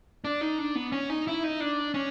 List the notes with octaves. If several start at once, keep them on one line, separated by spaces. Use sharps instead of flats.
D4
D#4
D4
B3
C#4
D#4
E4
D#4
D4
C#4